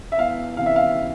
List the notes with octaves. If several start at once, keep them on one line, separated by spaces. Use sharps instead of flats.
E5
E2 F5
C3 E3 F5
E5
F5